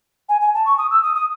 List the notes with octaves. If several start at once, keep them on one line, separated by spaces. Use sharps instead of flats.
G#5
G#5
A5
C#6
D#6
E6
D#6
D#6